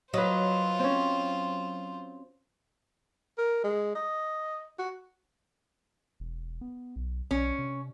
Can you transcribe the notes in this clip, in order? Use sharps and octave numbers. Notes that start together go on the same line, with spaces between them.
F#3 F4 B4 C5 D#5
C4 C#4
A#4
G#3
D#5
F#4
E1
B3
B1
B1 C#4
C3